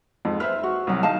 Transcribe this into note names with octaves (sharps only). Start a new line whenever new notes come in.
F2 G#2
B4 C5 E5 F6
F#4
C2 F#3
D#3 D#4 F5 A5